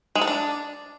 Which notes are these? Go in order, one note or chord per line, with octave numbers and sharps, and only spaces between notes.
G#3
A4
D4